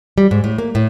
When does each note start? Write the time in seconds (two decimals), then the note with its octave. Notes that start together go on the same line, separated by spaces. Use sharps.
0.18 G3
0.31 G#2
0.44 A2
0.58 A#3
0.75 A2